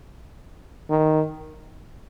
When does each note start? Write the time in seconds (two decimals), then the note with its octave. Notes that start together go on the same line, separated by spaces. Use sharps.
0.90 D#3